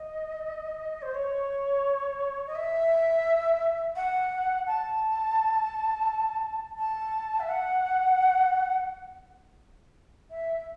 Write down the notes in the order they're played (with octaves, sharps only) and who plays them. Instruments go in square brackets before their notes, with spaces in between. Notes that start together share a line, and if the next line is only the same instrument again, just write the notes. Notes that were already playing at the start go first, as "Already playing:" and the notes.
Already playing: [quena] D#5
C5
C#5
D#5
E5
F#5
A5
A5
E5
F#5
E5